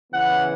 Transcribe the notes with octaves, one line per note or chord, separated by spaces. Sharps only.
C#3 E3 B3 E4 F#5